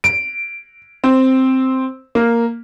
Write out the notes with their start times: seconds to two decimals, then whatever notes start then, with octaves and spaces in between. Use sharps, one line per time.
0.04 D7
1.04 C4
2.15 A#3